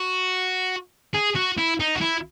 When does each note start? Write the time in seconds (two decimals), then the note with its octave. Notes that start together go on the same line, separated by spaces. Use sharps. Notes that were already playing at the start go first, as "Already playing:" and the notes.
Already playing: F#4
1.15 G#4
1.36 F#4
1.58 E4
1.80 D#4
1.96 F#4
2.01 E4